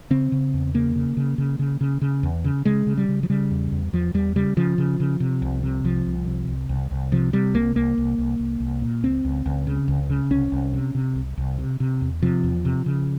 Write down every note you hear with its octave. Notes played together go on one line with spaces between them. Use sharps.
C#3 C4
C#3
E2
C#3 A#3
C#3
C#3
C#3
C#3
C#3
C#3
E2
C#3
C#3 G#3
C#3
G3
C#3
F3
C#3 G3
E2
E2
E2 F3
E2 G3
C#3 G3
C#3 F3
C#3
C#3
C3
C2
C3
C2 F3
C2
C3
C2
C2
C2
C3 F3
C3 G3
C2 A#3
C2 A#3
C2
C2
C2
C2
A#2
C#2 C4
C#2
C#2
C#3
C#2
C#3
C2 C#4
C2
C3
C3
C2
C2
C3
C3
E2
C3 F3
E2
C3
C#3